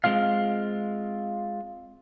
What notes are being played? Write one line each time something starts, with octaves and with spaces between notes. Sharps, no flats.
G#3 C4 F4 F5